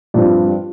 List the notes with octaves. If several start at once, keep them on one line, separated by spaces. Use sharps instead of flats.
G2 F3 G3 C4 F4